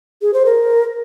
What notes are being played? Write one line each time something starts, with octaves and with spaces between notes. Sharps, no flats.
G#4
C5
A#4